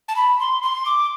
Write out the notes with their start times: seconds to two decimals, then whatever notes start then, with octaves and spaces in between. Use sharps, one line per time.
0.08 A5
0.16 B5
0.39 C6
0.62 C6
0.86 D6